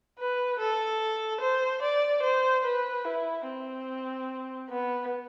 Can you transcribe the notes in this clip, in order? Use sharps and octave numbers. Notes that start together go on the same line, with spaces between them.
B4
A4
C5
D5
C5
B4
E4
C4
B3